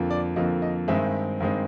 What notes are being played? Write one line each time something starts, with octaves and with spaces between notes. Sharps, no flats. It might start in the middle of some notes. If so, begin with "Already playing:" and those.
Already playing: F2 D3 F3 A#3
D5
F2 D3 F3 A#3 D#5
D#5
G2 D#3 G#3 C4 E5
G2 D#3 G#3 C4